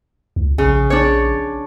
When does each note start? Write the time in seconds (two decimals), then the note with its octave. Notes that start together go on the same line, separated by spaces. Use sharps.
0.36 C#2
0.58 A#1 C#3
0.90 D4 C#5